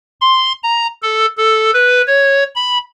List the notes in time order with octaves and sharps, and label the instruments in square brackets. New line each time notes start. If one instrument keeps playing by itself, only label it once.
[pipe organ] C6
A#5
A4
A4
B4
C#5
B5